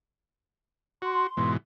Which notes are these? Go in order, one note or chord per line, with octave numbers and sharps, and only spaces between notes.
F#4 C6
G#2 B2 E3